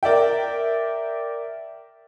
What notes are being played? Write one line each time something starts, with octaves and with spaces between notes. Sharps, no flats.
A#4 D5 E5 G5